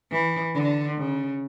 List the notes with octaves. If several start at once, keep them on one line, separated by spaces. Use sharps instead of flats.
E3
D3
C#3